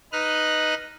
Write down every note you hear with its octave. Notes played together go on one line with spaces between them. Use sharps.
D#4 B4 D#5 F6 F#6